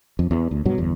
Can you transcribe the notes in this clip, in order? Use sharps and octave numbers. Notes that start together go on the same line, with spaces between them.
F2
E2
D2
G2 B2 F#3
G1 E2